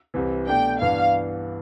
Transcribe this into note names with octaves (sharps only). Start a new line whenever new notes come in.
C2 C3 E3
B2 A3 D4 G5
G2 E3 B3 D4 F5